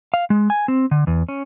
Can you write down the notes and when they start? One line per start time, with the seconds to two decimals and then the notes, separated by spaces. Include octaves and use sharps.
0.14 F5
0.30 G#3
0.50 G#5
0.68 C4
0.91 D3
1.07 E2
1.29 C#4